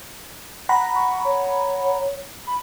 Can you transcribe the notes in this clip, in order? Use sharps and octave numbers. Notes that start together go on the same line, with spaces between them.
F#5 A#5 B5
C#6
C#5
B5